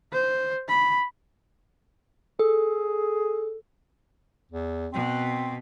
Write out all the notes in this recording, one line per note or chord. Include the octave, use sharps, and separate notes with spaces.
C5
B5
G#4 A4
E2
B2 C4